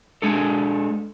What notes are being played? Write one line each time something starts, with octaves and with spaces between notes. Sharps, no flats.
G#3 D4 A4